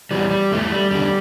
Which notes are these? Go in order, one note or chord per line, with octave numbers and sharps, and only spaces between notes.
E2 E3 G3
G3
E2 E3 A3
G3
E2 D3 G3